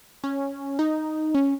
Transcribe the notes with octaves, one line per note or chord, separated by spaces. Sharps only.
C#4
D#4
C#4